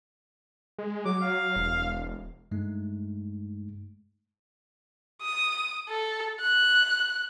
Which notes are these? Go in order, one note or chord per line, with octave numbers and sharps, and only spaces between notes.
G#3
F#3 D6
F5
E1
G2 G#3 A3 D#4
D#6
A4
F#6